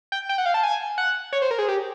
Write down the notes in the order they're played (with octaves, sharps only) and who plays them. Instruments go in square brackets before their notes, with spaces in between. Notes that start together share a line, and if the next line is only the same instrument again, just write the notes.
[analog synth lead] G5
G5
F#5
F5
A5
G#5
F#5
C#5
C5
A#4
G#4
G4